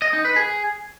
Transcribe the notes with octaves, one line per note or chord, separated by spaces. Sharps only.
D#5
D#4
B4
G#4